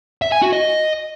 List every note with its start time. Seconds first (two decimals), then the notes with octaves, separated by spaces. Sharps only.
0.22 E5
0.32 G#5
0.42 F#4
0.53 D#5